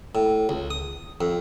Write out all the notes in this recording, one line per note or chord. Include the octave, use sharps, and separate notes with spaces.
A2
C#2
D#6
F2